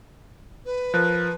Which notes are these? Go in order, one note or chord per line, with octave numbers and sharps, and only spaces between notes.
B4
F3 A#4 F#6